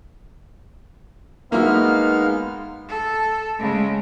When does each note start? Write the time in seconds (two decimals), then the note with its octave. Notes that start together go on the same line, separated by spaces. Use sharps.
1.52 G#3 A#3 B3 D#4 F#4 E5 F5 F6
2.89 A4
3.59 C#3 G#3